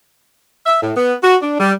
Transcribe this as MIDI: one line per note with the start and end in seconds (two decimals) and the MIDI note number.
0.66 0.78 76
0.81 0.91 45
0.95 1.13 59
1.22 1.36 66
1.41 1.54 62
1.59 1.71 55